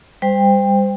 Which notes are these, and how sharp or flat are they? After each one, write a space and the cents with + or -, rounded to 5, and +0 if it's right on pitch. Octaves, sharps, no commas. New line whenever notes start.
G3 +25 C5 -20 G5 +20